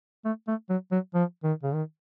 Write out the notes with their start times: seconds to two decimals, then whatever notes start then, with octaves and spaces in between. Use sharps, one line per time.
0.25 A3
0.48 A3
0.70 F#3
0.91 F#3
1.14 F3
1.43 D#3
1.63 C#3
1.74 D#3